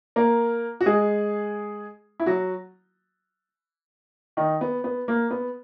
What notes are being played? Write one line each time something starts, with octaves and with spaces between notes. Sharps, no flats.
A#3 A#4
F#4
G#3 G#4
E4
F#3 F#4
D#3 D#4
B3
B3
A#3
B3